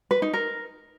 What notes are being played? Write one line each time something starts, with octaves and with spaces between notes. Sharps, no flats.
B4
D#4
A#4